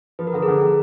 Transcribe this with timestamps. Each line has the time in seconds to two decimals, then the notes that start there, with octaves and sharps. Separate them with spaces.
0.19 F3 B4
0.27 A#4
0.34 D3 A4
0.42 G#4 A#4
0.48 D3
0.63 D3